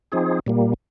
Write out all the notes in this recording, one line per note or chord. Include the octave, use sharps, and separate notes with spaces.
F3 C4 D#4 G#4
A#2 G3 A#3